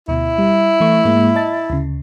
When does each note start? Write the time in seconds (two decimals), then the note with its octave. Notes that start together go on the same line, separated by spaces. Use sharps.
0.08 D2 B2 E4
0.38 G3
0.80 E3 A3 C#6
1.05 G#2 G#3 A#3
1.36 D#5 A5 A6
1.70 D2 C#3